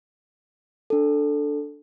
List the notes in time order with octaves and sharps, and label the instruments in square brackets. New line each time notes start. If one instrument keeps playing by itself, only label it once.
[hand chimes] D4 A4